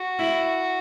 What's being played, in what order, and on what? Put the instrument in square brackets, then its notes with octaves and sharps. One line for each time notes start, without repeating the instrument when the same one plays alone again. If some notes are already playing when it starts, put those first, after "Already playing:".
Already playing: [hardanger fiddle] F#4
[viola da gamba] E4